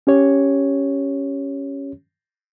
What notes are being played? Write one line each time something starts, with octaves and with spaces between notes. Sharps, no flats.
C#4 G4 C#5